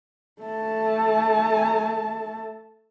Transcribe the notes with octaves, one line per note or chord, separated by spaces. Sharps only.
A3 A5